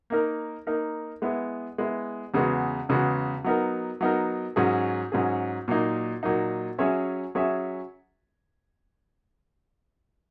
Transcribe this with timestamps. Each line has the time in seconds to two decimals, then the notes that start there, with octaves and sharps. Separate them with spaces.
0.10 A#3 D#4 A#4
0.67 A#3 D#4 A#4
1.22 G#3 B3 E4
1.78 G#3 B3 E4
2.34 E2 C#3 G#3 B3 F#4
2.89 E2 C#3 G#3 B3 F#4
3.44 F#3 B3 D#4 A#4
4.01 F#3 B3 D#4 A#4
4.56 G#2 F#3 C#4 G#4
5.12 G#2 F#3 C#4 G#4
5.68 A#2 F#3 A#3 D#4
6.23 A#2 F#3 A#3 D#4
6.78 F#3 C#4 G#4 C#5 E5
7.35 F#3 C#4 G#4 C#5 E5